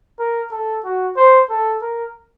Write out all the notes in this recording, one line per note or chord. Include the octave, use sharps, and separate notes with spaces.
A#4
A4
F#4
C5
A4
A#4